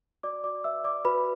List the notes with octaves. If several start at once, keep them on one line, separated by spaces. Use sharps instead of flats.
F#4 D5 D6
F#4 D5 D6
B4 E5 E6
D5 D6
F#4 B4 B5